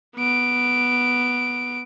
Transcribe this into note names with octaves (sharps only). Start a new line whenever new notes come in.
B3 D7